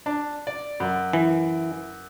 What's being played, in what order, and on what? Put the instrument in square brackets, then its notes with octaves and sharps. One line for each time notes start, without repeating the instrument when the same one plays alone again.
[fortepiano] D4
D5
F#2
[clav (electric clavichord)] E3